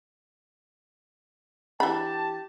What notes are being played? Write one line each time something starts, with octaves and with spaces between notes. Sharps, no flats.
E3 D4 G4 A5 B5